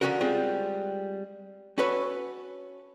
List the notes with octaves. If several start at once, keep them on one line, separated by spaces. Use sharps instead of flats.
D3 F3 C#4 D#4 F#4 A#4
G3 G#3 C4 F4
C#4 F#4 A4 B4 C#5